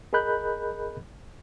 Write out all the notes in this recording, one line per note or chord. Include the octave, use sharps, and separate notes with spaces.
G#4 A#4 D#5 B5 F#6 G6